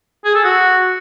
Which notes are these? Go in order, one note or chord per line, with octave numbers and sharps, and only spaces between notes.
G#4
A4
F#4